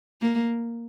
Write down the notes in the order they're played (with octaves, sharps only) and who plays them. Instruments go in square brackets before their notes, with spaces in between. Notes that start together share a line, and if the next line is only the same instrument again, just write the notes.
[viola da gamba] A#3